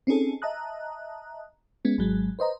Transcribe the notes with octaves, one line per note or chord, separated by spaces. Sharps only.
C4 C#4 D#4 G#4 A4
D#5 E5 A5 A#5 D#6 F#6
G#3 B3 C#4
G#1 G#2 F#3 G#3
B4 C5 D#5 A#5